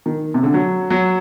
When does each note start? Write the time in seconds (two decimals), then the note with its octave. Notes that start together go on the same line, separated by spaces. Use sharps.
0.06 D#3
0.34 C3
0.43 D3
0.54 F#3
0.90 F#3